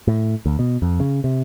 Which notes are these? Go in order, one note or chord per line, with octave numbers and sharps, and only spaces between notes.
A2
D2
B2
F2
C#3
C3